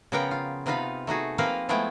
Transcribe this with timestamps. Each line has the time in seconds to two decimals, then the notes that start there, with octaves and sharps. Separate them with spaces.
0.12 C#3 F3 B3 A#4 F#5 G5
0.31 F4
0.66 C3 B3 D#4 F4 B4 F5
1.07 A3 D#4 F#4 G#4
1.38 F3 A#3 C4 A#4 B4 F5
1.69 F3 G#3 A3 B3 E4 G5